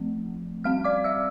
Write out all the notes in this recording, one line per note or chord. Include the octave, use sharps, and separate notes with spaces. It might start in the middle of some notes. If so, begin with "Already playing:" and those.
Already playing: F3 A3 C4
G3 C4 F5 F6
D5 D6
E5 E6